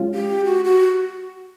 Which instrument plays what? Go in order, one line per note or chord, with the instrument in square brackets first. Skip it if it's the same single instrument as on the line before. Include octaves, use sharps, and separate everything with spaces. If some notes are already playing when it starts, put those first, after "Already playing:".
Already playing: [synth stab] G#3 C#4 F4
[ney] G4
F#4
F#4